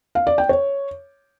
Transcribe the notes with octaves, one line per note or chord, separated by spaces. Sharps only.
F5
D5
G5
C#5